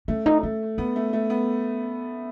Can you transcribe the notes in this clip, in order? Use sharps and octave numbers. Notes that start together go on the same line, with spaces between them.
A3 C#4
D#4
A3 C#4
B3 C#4
A3
A3
B3